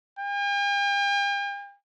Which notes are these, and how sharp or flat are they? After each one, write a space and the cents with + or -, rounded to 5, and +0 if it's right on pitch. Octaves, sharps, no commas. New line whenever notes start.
G5 +45